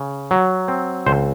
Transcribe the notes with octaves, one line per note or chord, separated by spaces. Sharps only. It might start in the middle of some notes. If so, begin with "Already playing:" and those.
Already playing: C#3
F#3
C4
C#2 C5